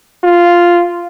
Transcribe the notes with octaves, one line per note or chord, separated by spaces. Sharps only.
F4